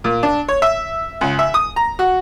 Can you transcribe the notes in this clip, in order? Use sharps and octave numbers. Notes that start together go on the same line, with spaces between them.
A#2
D4
C#5
E5
C#2
E5
D#6
A#5
F#4